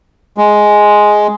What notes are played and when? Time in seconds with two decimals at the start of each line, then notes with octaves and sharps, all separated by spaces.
0.37 G#3